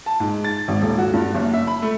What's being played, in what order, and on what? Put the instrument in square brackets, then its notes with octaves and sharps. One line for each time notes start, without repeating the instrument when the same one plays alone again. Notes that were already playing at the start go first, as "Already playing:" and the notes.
[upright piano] A5
G#2
A6
G#1
D#1
F#4
G2
F#1
E5
B5
A3